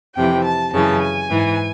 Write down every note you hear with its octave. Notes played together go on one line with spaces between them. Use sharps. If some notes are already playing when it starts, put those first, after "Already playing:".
F2 C3 E3 G5
A5
F#2 C#3 E3 A5
G#5
G#2 E3